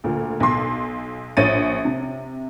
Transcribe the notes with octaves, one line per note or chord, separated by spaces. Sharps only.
D2 A#2
B1 C6
A#1 C#4 C#5 A6 D#7
C3